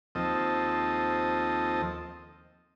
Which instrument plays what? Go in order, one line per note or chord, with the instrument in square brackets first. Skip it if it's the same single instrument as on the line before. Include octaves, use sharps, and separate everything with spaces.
[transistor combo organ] D#2 F3 C4 A4 D#5